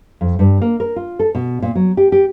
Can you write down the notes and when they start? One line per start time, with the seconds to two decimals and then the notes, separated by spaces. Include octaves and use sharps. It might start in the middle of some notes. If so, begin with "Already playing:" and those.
0.21 F2
0.39 G2
0.62 A#3
0.80 A#4
0.96 F4
1.19 A4
1.35 B2
1.62 A#2
1.75 F#3
1.97 G4
2.12 G4